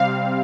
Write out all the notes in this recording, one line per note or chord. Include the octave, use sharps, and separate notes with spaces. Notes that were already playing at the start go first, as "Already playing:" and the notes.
Already playing: C3 G3 C4 F5